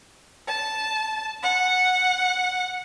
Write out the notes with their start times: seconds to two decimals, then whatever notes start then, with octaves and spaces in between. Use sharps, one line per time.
0.48 A5
1.43 F#5